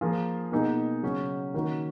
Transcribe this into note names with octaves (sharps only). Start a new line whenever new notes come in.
F3 A#3 F4 G#4
B2 A#3 D#4 G#4
C#3 F#3 C#4
D#3 A#3 C#4 F#4